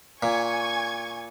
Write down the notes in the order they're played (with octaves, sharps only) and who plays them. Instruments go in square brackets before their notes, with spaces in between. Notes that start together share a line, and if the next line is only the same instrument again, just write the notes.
[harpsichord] A#2 [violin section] G#5 C#6 G#6